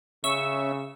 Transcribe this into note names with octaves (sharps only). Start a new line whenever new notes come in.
C#3 C#4 E5 C#6 E6